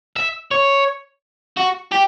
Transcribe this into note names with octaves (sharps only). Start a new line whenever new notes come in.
E5
C#5
F#4
G4